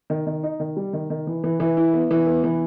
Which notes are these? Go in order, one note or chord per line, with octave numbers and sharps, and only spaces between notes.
D#3
D#3
D#4
D#3
G3
D#3
D#3
E3
E3
E3
E4
B3
E3
B3
E3